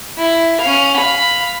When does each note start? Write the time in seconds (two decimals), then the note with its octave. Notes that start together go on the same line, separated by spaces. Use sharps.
0.19 E4
0.62 C#4 F5
0.98 F5 B5